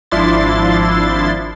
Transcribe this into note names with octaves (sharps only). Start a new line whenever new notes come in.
G#1 F3 D4 E4 C6 A6